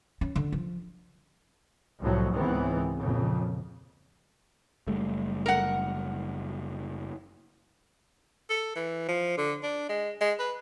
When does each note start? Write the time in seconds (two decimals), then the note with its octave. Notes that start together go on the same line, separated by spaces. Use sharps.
0.21 C#4
0.36 D3
0.52 F3
2.01 C2 A2 F3 F#3
2.31 C#2 G#2 D#3 E3 B3 C4
2.97 F2 A#2 C#3
4.87 F#1 G3 A3
5.46 A#4 F#5
8.49 A4
8.76 E3
9.08 F3
9.37 D3
9.63 D4
9.89 G#3
10.21 G#3
10.39 B4